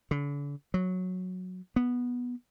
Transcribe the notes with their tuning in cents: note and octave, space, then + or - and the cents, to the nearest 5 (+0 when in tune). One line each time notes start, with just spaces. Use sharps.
D3 -40
F#3 -10
B3 -10